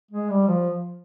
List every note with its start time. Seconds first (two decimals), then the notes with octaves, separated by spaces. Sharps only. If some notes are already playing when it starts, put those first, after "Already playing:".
0.11 G#3
0.30 G3
0.48 F3